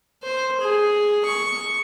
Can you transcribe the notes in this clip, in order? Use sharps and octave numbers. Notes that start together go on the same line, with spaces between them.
C5
G#4
C#6